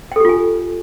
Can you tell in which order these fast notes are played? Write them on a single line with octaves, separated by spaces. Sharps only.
G5 A4 G4 F4 G#5